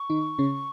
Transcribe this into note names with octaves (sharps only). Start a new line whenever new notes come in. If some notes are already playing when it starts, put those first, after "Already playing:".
Already playing: C#6
D#3 D#4
C#3 C#4